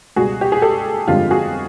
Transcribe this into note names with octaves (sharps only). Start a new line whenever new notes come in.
C#2 B2 G3 F#4 G#4
G4
G#4
G4 A4
G1 F2 D3 F3 G#3 F4 G4
F#4 G#4